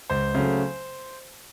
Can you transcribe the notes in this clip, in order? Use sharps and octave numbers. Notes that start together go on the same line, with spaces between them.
C#2 C5
C#3 F#3 A3